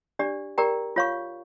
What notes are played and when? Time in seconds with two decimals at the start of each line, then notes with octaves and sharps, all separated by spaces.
0.19 D4 G4 D5
0.58 G4 A#4 D5 G5 A#5
0.96 F4 C#5 F5 C#6